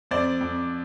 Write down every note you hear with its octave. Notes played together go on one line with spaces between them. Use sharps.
F2 C5 D5
F2